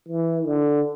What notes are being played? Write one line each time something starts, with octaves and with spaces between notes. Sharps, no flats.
E3
D3